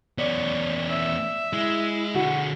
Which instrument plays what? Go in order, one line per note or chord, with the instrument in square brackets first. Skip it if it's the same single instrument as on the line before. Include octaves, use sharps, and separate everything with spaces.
[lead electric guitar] E2 C#5 [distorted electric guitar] B3 C#4 [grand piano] D5
[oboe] E5
[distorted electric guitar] G#3 [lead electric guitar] E4
[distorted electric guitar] D3 G#4 [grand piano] F#4